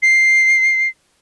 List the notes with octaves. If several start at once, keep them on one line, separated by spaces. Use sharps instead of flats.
C7